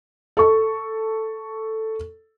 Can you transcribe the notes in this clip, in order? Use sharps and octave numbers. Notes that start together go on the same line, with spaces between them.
A4 C#6